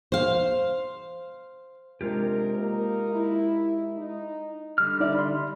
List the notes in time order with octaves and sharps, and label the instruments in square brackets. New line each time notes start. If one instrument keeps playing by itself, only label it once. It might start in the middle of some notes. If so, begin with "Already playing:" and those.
[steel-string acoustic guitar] C5 F5
[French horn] C3 [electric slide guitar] G#3 F4 G4 [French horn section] D4 D#4 A#4
[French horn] A#3 [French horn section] D#4 A#4
[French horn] E4
[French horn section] D#4
[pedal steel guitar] D3 G3 F6
[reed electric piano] D#4 D5 E5
B5 C6